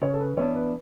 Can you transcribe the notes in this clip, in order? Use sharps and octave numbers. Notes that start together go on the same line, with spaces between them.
C#3 C#5
A4
B4
E3 B3 D4 C#5
B4